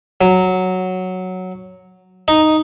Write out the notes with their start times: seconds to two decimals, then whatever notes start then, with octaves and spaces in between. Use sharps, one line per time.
0.21 F#3
2.28 D#4